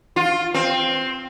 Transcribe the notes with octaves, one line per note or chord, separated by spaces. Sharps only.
F4
C4